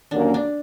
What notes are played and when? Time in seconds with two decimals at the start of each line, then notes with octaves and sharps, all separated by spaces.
0.11 D#2 D3 F#3 A#3 C#4 D4
0.34 D4